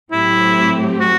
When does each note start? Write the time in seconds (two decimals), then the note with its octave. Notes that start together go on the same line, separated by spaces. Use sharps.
0.12 A2 F#3 C4 E4 G4
1.00 F#4